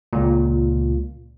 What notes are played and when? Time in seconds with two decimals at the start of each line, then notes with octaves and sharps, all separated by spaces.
0.13 C#2 A#2